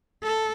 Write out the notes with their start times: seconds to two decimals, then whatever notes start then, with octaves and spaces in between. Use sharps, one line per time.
0.23 A4